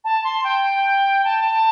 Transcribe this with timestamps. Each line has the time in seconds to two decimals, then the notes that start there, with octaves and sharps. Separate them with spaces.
0.04 A5
0.24 C6
0.44 G5
1.24 A5